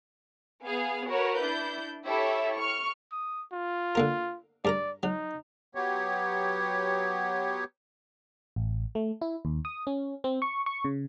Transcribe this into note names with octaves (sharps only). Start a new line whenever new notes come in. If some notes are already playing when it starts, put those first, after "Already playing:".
B3 G#4 F5 G#5
F#4 A#4 B4 C#5
D4 E4 G6
E4 G4 A4 C#5 E5
C#6 F6
D#6
F4
D3 A#3 A#4
G2 A#4 D5 A#5
F#3 D#4
F#3 B3 G4 C#5
A1
A3
E4
D#2
D#6
C#4
C4
C#6
C#6
C#3